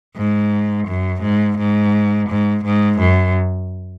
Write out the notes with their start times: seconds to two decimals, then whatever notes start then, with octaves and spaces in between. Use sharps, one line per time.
0.17 G#2
0.87 F#2
1.22 G#2
1.58 G#2
2.29 G#2
2.65 G#2
3.00 F#2